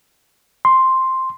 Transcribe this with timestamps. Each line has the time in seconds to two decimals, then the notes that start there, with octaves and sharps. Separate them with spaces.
0.65 C6